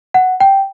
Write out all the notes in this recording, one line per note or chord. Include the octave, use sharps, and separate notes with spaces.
F#5
G5